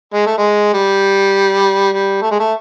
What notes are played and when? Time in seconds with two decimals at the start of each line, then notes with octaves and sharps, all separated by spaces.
0.13 G#3
0.26 A3
0.38 G#3
0.73 G3
1.92 G3
2.21 A3
2.31 G#3
2.39 A3